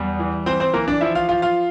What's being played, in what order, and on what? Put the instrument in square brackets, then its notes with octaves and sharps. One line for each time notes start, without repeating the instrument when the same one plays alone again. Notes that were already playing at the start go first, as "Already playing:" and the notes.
Already playing: [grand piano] E2 G3
E3
E3 C4 C5
C4 C5
E3 A#3 A#4
D4 D5
F3 E4 E5
F4 F5
F3 F4 F5
F4 F5